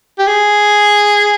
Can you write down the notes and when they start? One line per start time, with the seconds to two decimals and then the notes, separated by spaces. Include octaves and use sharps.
0.19 G4
0.28 G#4